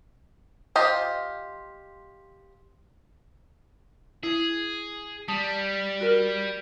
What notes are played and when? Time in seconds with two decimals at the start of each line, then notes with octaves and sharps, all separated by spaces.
0.76 F4 G4 C5 D#5
4.23 E4 G#4
5.28 G3 A5 D#6
6.01 F#4 A#4 F6